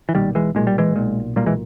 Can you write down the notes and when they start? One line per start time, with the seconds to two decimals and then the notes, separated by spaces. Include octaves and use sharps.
0.09 E3
0.15 B1 A#2 D#3 G3
0.35 E3 G#3
0.55 B1 A#2 G#3
0.67 G3
0.78 E3 G#3
0.96 B1 A#2
1.36 B1 A#2 G3 A#3
1.46 E3 G#3